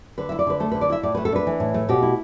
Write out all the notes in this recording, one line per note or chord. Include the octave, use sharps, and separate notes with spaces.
D3 B4
E4 E5
D5
D3 B4
A3 A4
D3 B4
D5
E4 E5
A2 D5
A3 B4
A4
D4 B4
E3
A2
A3
B2 G4
E4